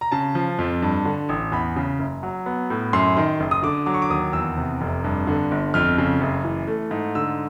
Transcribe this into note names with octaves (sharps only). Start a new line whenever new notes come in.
A#5
C#3 A5
F3
F2
G2
D3
A1
E2 B5
C#3
F#1
F#3
B3
A2
F#2 C6
D#3
F#1
D#6
D3 D6
F#3 D6
C#6
D6
D#2 D#6
E2 E6
C3
F1
G2
D3
G1
F2 F6
C#3
F#1
E3
A3
G#2
D3 E6